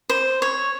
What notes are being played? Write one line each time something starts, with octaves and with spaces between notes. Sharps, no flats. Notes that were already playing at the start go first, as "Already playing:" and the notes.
C5
C#5